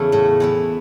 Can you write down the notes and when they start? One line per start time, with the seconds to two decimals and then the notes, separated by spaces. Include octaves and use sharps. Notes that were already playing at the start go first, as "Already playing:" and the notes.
Already playing: E2 C#3 E3 A3 E4
0.12 A2
0.40 E3 B3 E4